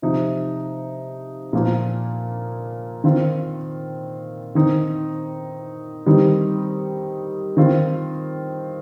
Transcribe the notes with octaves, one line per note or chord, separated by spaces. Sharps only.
C3 F3 D#4
A#2 F3 A#3 F4
D#3 C4 F4
D#3 C4 D#4
D#3 G3 C4 D#4
D#3 C4 F4